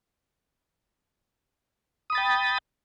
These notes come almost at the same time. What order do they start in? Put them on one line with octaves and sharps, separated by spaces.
D#6 B5 A6 G5